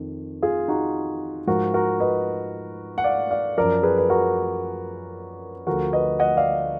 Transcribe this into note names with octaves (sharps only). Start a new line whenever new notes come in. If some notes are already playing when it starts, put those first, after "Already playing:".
Already playing: F2 D#3
F4 G#4
D#4 F#4
G#2 F3 F#4 A#4
F#4 A#4
B4 D#5
F#5
D5 F5
D5 F5
F#2 F3 A#4 D5
G#4 B4
B4
F#4 A#4
D2 D3 F3 F#4 A#4
B4 D#5
D#5 F#5
D5 F5